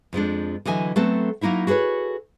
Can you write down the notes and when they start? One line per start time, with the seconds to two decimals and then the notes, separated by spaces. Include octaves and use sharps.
0.13 F2 F3 G#3 D4
0.65 D3 E3 F#3 D#5 E5 G#5
0.96 F#3 A3 B3 C4 A4 A5
1.41 F#3 A#3 D#4 E4 E5
1.67 F#4 G#4 A4 B4 C#5